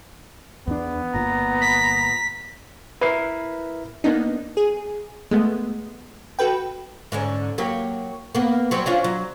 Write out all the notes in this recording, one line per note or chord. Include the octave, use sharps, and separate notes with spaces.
E2 B3 D4
G1 A#2 A#5
B6
E4 A#4 B4 C7
A#3 B3 D4 D#4
G#4
G#3 A3 B3
F#4 A4 B4 G5
G#2 D3 C#4
F#3 A#3 G4
A#3 B3
F#3 G3 C4
C#4 D4 F4
F#3